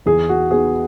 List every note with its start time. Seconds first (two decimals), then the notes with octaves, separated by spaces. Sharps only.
0.06 E2 G#4
0.29 F#4
0.51 B3 G#4